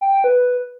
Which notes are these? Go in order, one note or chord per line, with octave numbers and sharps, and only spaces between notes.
G5
G5
B4